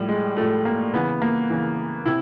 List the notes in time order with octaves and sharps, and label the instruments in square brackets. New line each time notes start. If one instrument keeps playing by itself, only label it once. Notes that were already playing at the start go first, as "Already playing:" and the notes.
Already playing: [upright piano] A2 F3 G3
G#3
A2 F3 A3
A#3
C#3 E3 B3
A#3
C#3 E3
C3 E4